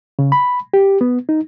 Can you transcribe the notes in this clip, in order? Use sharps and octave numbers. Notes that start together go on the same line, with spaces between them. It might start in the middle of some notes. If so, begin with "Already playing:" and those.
C#3
B5
G4
B3
D#4